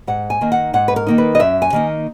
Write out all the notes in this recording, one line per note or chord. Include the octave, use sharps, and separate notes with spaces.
G#2 F#5
G#5
D#3 A#3 D#4
F#5
G#2 F#5
B4
A#4
D#3 A#3 D#4
B4
D#5
F#2 E5
G#5
D#3 A#3 D#4